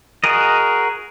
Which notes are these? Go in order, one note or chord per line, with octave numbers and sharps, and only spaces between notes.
F#4 G#4 A#4 D#5